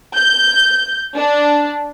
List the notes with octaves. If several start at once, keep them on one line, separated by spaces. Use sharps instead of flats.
G6
D4